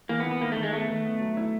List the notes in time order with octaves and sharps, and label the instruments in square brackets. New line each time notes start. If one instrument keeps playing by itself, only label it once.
[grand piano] E3 [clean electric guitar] A#3
[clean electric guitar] B3
[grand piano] E3
[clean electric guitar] B3
[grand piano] D#3 [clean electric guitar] A#3
[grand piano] D#3 [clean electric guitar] A3
[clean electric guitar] G#3
[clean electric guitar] A3 [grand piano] B3
[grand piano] D#3
B3
F#3
E4